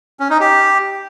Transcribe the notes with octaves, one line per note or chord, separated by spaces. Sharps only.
C#4
D#4
G4